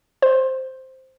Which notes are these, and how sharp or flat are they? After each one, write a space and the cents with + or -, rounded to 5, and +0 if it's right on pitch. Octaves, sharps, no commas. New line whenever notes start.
C5 +0 C6 +20